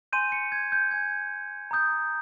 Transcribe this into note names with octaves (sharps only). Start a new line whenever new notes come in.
G#5 C6 G6 D#7
C#7
G#6
G6
G#5 C6 G6 G#6
A#5 D#6 G6